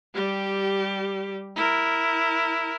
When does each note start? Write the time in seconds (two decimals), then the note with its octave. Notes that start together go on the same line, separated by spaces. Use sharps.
0.14 G3 G4
1.56 E4 A#4